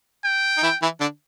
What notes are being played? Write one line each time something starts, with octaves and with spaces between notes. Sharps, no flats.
G5
D#4
E3 E4
E3 E4
D3 D4